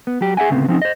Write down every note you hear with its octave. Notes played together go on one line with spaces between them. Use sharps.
B3
F#3 G4
G#4 E5 F#5 G#5
D2 A2 C#3 B3 C4
F3 C4 C#4 D#4
C5 D#5